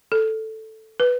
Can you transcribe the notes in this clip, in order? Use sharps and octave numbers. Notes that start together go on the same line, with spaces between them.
A4
B4